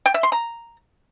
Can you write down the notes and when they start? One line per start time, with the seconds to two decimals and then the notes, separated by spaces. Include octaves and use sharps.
0.06 G5
0.14 E5
0.23 C6
0.32 A#5